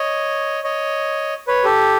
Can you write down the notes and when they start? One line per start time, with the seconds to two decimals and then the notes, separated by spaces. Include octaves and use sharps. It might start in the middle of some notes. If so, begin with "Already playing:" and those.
Already playing: C#5 D#5
0.64 C#5 D#5
1.48 B4 C#5
1.64 G4 A4